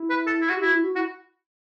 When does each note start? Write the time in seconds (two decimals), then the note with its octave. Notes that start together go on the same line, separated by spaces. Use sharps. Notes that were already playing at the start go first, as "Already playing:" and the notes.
Already playing: E4
0.10 B4
0.27 A4
0.41 E4
0.49 F#4 G4
0.61 E4 F#4
0.72 E4
0.84 F#4
0.95 E4 F#4